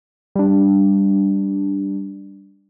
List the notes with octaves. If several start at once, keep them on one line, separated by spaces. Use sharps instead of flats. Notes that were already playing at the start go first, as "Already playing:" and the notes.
G3 D4